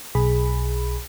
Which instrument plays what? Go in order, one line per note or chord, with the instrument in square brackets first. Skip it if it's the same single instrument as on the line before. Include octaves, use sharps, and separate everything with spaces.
[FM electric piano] B1 G#4 B5